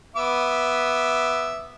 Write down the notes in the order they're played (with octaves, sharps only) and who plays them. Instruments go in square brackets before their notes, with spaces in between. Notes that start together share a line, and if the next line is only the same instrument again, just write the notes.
[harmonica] B3 E5 D6